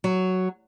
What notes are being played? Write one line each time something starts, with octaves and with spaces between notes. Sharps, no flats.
F#3